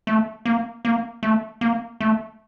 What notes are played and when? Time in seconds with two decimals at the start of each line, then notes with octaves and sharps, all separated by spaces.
0.07 A3
0.45 A#3
0.85 A#3
1.23 A3
1.61 A#3
2.01 A3